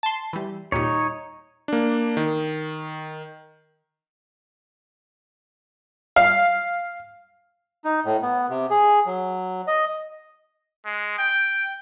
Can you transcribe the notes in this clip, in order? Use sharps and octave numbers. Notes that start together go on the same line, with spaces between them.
A5 C6
E3 G3
D#2 A#2 G3 D#4 C#5
A#3 D4
D#3
F5
D#4
A2
B3
C3
G#4
F#3
D#5
G#3
G5